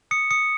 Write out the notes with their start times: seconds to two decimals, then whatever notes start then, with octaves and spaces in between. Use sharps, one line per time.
0.11 D#6 C#7
0.31 D#6 C#7